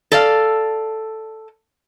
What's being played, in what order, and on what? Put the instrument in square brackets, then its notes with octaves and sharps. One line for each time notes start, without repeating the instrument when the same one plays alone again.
[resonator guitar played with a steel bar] A4 D5 F5